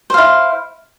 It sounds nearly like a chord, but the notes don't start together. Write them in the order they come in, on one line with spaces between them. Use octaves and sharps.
C5 F5 E4